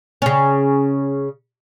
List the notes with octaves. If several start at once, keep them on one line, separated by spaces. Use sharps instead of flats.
C#3 C#4